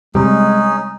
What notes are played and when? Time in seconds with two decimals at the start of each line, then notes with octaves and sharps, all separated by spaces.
0.15 C3 G3 G#3 C#4 D#4 G#4